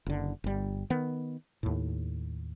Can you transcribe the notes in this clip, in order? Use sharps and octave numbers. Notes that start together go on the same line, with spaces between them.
F#1 D3
G1 G3
D#3 B3
D#2 A2